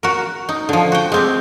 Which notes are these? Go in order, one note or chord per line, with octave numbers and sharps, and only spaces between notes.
F#4 A#4
D#4
D3 F3
F#4 G5
G#3 C4 G4